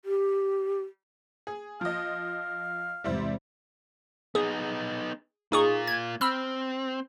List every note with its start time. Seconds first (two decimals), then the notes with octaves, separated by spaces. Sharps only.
0.05 G4
1.47 G#4
1.81 F3 D#5 F5
3.04 E2 G#2 C3 G3 E4 C5
4.35 B3 D#4 G#4
5.52 A#3 D#4 F4 G#4 C#6
5.87 G#6
6.21 C4 B5 E6 F6